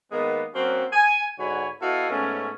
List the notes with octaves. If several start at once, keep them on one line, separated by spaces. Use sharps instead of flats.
D#3 G#3 A#3 B3
F#3 A#3 C4 C#4 F#4
G#5
G#2 D3 F#4 C#5 G#5 B5
B3 E4 F#4 A4 D#5 F5
G#2 A3 B3 C#4